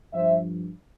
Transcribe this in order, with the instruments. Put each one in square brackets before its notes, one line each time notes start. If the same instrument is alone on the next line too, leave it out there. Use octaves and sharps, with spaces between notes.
[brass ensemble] G2 F3 C5 E5